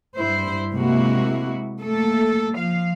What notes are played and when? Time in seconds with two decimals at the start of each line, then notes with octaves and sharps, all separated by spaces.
0.18 G2 E4 C5
0.73 C3 G#3 A#3 E4 F#4
1.80 A3 A#3 A4
2.54 F3 F5